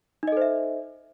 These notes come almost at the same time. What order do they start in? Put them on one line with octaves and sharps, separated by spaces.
D#4 D#5 A4 C5 E5